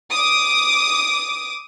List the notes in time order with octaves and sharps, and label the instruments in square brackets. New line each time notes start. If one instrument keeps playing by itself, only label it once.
[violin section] D6 D#6